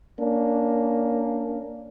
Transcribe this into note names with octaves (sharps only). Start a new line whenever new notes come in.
A#3 C#4 D4